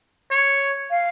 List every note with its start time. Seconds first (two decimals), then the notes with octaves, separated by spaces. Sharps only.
0.31 C#5
0.90 F5